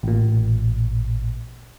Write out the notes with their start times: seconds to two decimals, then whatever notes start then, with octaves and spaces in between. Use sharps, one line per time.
0.03 A1 A#2